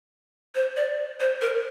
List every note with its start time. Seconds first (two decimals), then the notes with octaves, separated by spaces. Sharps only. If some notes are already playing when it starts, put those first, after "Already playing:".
0.55 C5
0.76 D5
1.20 C5
1.41 A#4